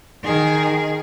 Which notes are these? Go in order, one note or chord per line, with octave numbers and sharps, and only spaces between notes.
D#3 G#4